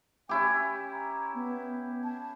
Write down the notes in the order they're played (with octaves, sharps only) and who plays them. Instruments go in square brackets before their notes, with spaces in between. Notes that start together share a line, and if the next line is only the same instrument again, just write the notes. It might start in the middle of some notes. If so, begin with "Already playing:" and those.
[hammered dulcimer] C#4 E4 G4 [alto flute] G#5
[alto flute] A#5
B3
A5